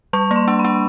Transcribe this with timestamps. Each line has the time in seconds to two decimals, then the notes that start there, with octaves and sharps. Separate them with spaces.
0.13 G3 C#6
0.31 A#3
0.36 C6
0.48 D4
0.59 B5
0.64 D4